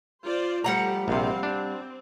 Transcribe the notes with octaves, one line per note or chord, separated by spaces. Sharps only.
F4 C5 D5
F3 G3 A3 G4 F#5 A#5
A#1 C3 C4 F5
C4 D4